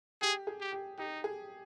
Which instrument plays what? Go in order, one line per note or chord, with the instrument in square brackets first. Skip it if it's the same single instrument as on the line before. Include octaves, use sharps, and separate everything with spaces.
[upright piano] G4 [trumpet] G#4
[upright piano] G#4
[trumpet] G4
[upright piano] G4
[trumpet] D#4 [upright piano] G4
[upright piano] G#4